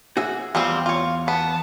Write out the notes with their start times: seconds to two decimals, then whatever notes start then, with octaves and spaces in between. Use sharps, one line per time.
0.17 F#4 G#4 E5
0.55 E2 F3 G3 C4
0.86 F4 C#5
1.28 B3 A5